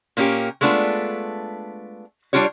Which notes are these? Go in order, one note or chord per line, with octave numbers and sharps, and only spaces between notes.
A#2 A#3 C#4 D4 G4
G#3 A3 B3 D4 F4
G3 D4 F4 G4 C#5